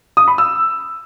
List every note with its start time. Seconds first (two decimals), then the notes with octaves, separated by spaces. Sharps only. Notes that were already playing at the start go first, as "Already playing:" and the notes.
0.17 D#6
0.28 B5
0.38 E6